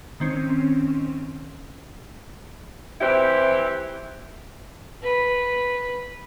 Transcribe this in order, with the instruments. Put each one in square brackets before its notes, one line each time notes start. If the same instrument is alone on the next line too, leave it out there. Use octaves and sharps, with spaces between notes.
[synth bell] D#3 C4 C#4
[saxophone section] E3 C4 E4 G4
[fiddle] B4